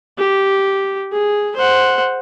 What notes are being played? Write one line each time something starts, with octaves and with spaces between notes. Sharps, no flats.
G4
G#4
C5 F#5